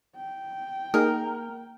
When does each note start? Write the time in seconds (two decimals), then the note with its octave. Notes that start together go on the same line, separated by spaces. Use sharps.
0.17 G5
0.94 A#3 D#4 G#4 A#4